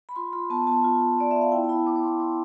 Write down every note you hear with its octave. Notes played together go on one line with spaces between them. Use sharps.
B5
F4 C6
F4 B5
B3 A5
B3 A5
F4
F4
B3 D5
B3 E5
F5
E4 G5
A5
E4 B5
B3 D6
D6
B3 C6
E4 D6